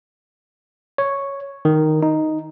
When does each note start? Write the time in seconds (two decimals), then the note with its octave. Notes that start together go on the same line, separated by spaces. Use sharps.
0.98 C#5
1.65 D#3
2.03 D#4